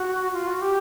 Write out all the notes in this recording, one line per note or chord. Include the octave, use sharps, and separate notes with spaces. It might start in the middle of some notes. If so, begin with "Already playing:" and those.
Already playing: F#4
F4
F#4
G4